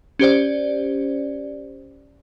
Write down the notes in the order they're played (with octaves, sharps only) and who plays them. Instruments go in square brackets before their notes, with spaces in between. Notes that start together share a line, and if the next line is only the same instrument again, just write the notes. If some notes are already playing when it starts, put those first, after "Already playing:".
[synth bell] C#4 G4 C5 D5